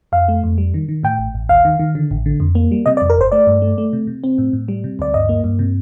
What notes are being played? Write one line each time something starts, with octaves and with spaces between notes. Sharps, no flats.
F2 F5
A3
F2
G3
D#3
D#3
A2 G5
A1
A1
D#2 F5
D#3
D#3
D3
A1
D3
F2
A#3
G3
C3 D#5
D5
F2
A#4
G1 C5
A3 D5
G2
A3
A3
C3
C3
C4
A2
A2
G3
C3
D2 D5
G2 D#5
A#3
G2
C3